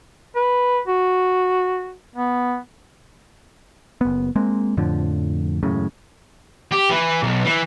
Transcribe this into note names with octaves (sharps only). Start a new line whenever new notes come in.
B4
F#4
B3
F#1 B3
G#3 A#3 C4
F2 A2 D3 F3
E1 F#2 A2 C#3
G4
E3
B1
E3